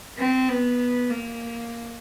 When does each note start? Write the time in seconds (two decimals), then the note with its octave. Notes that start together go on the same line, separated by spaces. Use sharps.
0.18 C4
0.50 B3
1.10 A#3